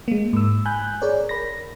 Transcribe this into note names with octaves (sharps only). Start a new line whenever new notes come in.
G#3 A#3
G#2 E6
G#5 B5 F#6 G6
G#4 A#4 C#5 D5
A#4 B5 A#6